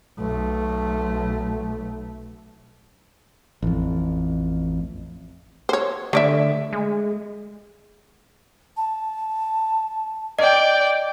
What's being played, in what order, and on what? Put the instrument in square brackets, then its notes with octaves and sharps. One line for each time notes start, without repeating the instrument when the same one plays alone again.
[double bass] B1 A3
[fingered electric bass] A1 F2
[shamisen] C5 C#5
[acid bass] D3 [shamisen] A3 D5 E5
[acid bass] G#3
[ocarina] A5
[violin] D5 G5 [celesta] D#5